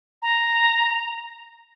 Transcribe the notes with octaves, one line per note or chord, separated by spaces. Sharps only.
A#5